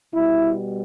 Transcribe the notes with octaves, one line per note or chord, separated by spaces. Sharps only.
B2 G3 E4